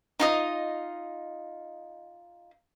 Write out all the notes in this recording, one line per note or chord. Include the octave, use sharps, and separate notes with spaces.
D#4 F4 D#5